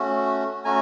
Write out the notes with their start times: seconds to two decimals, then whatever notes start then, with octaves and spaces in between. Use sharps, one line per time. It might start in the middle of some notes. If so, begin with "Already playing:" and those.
Already playing: A3 C#4 F#4
0.65 A3 C#4 F#4 G#5 A#5